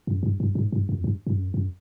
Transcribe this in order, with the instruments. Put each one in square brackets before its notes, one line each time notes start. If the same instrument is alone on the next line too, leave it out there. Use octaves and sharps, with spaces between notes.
[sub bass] F#2
G2
G2
G#2
G2
F2
G2
G2
F#2
F#2